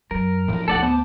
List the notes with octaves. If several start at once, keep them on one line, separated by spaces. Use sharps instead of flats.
F#2 A#4
A2 F3
D2 A4 D5 F#5
B3 C5 A5 D6